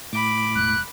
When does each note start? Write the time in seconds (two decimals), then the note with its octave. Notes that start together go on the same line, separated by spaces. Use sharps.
0.13 A2 B5 D6
0.55 E1 F#3 F#6